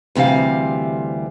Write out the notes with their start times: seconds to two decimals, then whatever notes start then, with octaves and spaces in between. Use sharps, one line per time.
0.15 D2 C3 E3 G3 F5